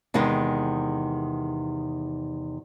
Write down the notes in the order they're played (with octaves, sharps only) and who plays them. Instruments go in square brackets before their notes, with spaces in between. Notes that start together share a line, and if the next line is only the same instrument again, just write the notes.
[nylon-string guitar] E2 C3 D#3 G#3 D#4